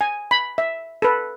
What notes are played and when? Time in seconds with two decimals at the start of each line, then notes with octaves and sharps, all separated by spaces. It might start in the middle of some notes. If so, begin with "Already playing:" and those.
0.01 G#5
0.31 B5
0.58 E5
1.02 A4 B4